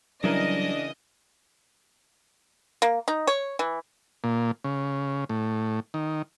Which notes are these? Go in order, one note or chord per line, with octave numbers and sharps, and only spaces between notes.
C#3 E3 F#3 G3 D4 A#4 D#5
A#3
D#4
C#5
E3
A#2
C#3
A2
D#3